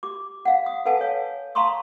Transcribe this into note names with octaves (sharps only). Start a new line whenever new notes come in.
G4 D6
F5 F#5
D#6
A4 B4 F5 F#5 G#5 A5
C#5 F5
F5 A5 A#5 C6 C#6 D#6